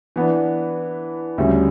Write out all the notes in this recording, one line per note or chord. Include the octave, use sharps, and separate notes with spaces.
E3 B3 D4
D2 C#3 G3 C#4 G4